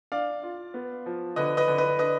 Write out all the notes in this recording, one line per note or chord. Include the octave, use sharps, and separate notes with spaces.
D4 D5 F5
F4
B3
F3
D3 B4 D#5
B4 D#5
D3
B4 D#5
D4 B4 D#5